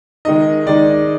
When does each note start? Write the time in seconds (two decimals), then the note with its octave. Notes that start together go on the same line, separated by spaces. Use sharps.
0.25 D#3 G#3 D#4 D#5
0.66 D#3 G#3 D#4 D5